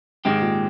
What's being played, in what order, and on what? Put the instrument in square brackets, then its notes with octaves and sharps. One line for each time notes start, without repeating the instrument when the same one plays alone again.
[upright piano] G#2 [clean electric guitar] D#3 G#3 C4 G4
[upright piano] A#2